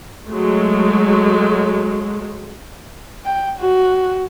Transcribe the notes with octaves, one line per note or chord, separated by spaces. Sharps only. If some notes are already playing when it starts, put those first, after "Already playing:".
F#3 G#3 A3
G5
F#4